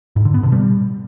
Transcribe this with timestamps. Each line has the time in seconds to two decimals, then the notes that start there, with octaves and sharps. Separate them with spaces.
0.16 G#2
0.25 D3
0.34 B3
0.43 B2
0.52 G3